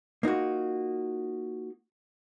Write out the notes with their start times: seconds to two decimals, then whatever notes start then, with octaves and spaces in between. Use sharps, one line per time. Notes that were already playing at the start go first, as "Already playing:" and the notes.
0.23 A#3 D#4 F4 F#4